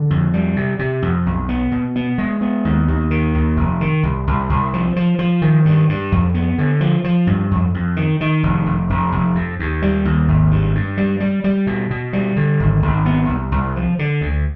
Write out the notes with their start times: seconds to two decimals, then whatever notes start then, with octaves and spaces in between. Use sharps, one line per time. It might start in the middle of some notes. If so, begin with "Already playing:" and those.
Already playing: D3
0.10 F2
0.34 G3
0.56 C3
0.79 C3
1.02 F2
1.26 B1
1.49 B3
1.72 B2
1.96 B3
2.18 G#3
2.41 B3
2.65 D#2
2.88 D#2
3.11 D#3
3.35 D#2
3.57 F1
3.81 D#3
4.03 C2
4.27 C2
4.50 C2
4.73 F3
4.96 F3
5.19 F3
5.42 D#3
5.65 G2
5.89 G2
6.12 F2
6.34 B3
6.58 D3
6.81 F3
7.04 F3
7.27 G2
7.51 F2
7.74 F2
7.96 D#3
8.21 D#3
8.43 F1
8.66 F1
8.89 F1
9.12 F1
9.35 F2
9.59 D#2
9.82 G3
10.05 D#2
10.28 G#1
10.51 G2
10.75 G2
10.97 G3
11.20 G3
11.44 G3
11.67 B2
11.91 B2
12.13 G3
12.37 D3
12.60 G#1
12.82 G#1
13.05 B3
13.29 C2
13.52 C2
13.76 F3
13.99 D3
14.21 D2